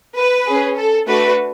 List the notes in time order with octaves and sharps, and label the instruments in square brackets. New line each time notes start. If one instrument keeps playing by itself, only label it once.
[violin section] B4
C#4 G#4
A4
A3 D4 F#4 A4 B4